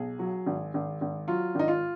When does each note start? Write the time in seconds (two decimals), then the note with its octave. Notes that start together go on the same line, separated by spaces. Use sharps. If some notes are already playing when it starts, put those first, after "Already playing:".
Already playing: B1 G#4
0.19 F#3
0.46 G#1
0.74 G#1
1.01 G#1
1.28 F#3 F4
1.55 G#1 D#4
1.68 F4